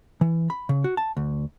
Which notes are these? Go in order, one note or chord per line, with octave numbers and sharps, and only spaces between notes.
E3
B5
C#3
F#4
A5
D2